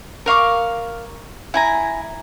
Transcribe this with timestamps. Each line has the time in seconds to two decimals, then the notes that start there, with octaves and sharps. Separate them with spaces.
0.26 A#4 F5 C#6 D6
1.54 E4 G#5 A#5